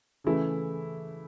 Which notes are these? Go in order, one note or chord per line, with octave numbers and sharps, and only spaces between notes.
C#3 E3 A3 E4